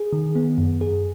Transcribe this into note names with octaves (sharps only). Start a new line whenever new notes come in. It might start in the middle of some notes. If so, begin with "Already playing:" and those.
Already playing: G#4
D#3
B3
F#2
G#4